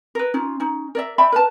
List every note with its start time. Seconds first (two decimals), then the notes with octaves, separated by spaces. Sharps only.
0.15 A#4 B4
0.34 C#4 D#4 F4
0.60 C#4 D#4
0.95 A#4 D5 E5
1.18 D5 E5 G5 B5
1.32 A#4 B4 A5